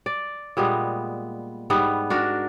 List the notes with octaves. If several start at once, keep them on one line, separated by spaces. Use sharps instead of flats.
D5
A#2 G3 G#3 B3
G#2 G3 B3
D4 F#4 A#4